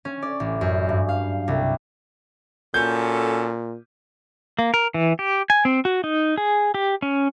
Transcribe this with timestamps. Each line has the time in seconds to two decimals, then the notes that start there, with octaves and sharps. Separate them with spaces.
0.05 C#4
0.22 D5
0.40 A1
0.61 F#2
0.89 G2
1.09 F5
1.48 C2
2.74 A#2 C#4 F#4 A4 G6
4.59 A#3
4.74 A#4
4.94 E3
5.19 G4
5.50 G#5
5.65 C4
5.85 F#4
6.04 D#4
6.38 G#4
6.74 G4
7.02 C#4